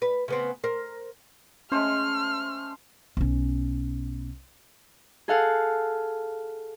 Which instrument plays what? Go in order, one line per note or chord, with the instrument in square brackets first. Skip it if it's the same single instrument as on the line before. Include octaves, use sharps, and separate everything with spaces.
[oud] B4
C#3 B3 C4
A#4 C5
[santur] G#3 A3 C5 [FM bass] C#4 [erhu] F6
[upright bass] B1 C#4
[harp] G#4 A4 F5 F#5